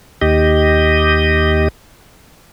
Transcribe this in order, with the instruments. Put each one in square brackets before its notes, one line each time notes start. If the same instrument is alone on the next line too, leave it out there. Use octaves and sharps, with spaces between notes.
[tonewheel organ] D#2 G4 D#5